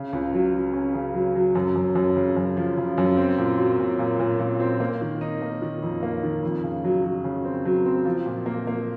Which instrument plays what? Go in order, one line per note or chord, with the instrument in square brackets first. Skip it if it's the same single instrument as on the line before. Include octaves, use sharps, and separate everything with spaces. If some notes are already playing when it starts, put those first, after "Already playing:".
Already playing: [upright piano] C#3
C#2
F#3
F#3
C#4
C#3
F#3
F#3
F#2
F#2
F#2
C#3
F#2
F3
C#3
F#2
C4
A#2
F#3
A#2
A#2
A#2
A#2
C4
A#3
D#3
D#4
A#3
D#3
F2
A#3
D#3
F2
C#3
F#3
F#3
C#3
C4
F#3
C4
F3
A#2
A#3
A#3